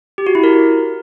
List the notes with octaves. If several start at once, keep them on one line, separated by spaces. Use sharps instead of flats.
G4
F#4
E4
A#4